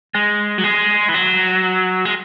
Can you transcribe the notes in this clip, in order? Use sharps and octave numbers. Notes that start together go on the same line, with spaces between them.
G#3
F#3
G#3
E3
F#3
G#3